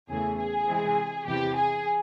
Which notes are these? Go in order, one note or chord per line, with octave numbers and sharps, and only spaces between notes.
E2 C#3 E3 A3 G#4
G#4
C3 E3 G#3 C4
E2 C3 E3 G4
G#4